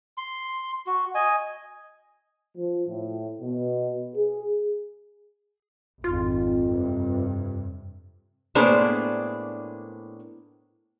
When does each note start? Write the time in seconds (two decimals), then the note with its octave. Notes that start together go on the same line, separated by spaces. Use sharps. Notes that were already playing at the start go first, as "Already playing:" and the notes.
0.17 C6
0.87 F#4
1.15 D#5 G#5
2.57 F3
2.88 A2
3.41 B2
4.16 G#4
6.04 G#1 F2 F4
6.66 G2 C3
8.55 A2 A#3 B3 D4 G#4 C5